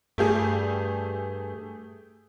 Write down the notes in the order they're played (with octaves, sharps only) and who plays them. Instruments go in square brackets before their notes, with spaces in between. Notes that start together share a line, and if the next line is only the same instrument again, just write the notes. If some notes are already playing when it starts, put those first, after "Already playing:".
[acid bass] G2 [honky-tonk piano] A3 G4 G#4